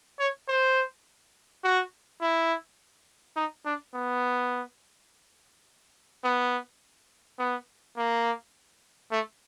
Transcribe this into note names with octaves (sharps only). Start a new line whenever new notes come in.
C#5
C5
F#4
E4
D#4
D4
B3
B3
B3
A#3
A3